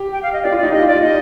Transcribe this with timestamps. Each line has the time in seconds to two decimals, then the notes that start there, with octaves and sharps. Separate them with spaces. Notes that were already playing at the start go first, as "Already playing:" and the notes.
Already playing: G4
0.12 G5
0.23 F5
0.33 D#5
0.43 G4 D5
0.52 F4
0.57 D5
0.63 D#4
0.72 G4 D#5
0.83 F4
0.87 D5
0.93 F4
1.03 D#4 D#5